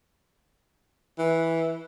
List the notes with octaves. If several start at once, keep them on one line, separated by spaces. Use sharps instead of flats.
E3